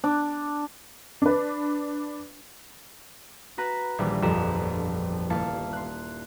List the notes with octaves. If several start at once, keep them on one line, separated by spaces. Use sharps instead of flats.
D4
D4 B4
F#4 B4 A#5 F#6
D#1 A#1 E3 G3
G1 F2 F3 G4 A#5 E7
A#1
D#1 A#3 E4 F5 A5 C#7
C6 F#6